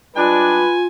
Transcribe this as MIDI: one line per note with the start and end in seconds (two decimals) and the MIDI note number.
0.16 0.63 55
0.16 0.63 56
0.16 0.63 62
0.16 0.87 65
0.16 0.75 71
0.16 0.85 80